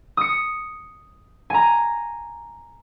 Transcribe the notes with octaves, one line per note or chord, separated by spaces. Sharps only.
D#6 C#7
G#5 A#5